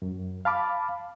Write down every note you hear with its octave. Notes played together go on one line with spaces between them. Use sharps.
F#2
F5 A5 B5 D6